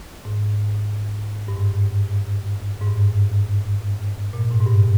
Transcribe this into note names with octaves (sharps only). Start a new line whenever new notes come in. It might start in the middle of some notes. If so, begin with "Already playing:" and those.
G#2
G2
G#2
G#2
G2
A#2
G#2
G#2
G2